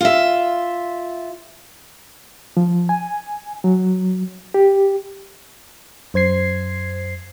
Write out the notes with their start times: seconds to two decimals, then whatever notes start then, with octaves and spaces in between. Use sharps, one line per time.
0.01 F4 E5
2.57 F3
2.89 G#5
3.64 F#3
4.54 G4
6.14 F#2 C5 G#6 C7